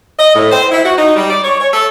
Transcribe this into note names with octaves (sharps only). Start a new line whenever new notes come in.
D#5
A2
C5
E4
F#4
D#4
G3
D5
C#5
C#5
A4